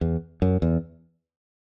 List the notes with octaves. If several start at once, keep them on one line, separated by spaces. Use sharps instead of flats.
E2
F#2
E2